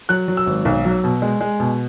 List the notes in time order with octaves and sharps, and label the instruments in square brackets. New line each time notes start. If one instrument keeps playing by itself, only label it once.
[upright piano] F#3 F#6
F#3
E6
G#1
B1
F#3
B2
G#3
G#3
B2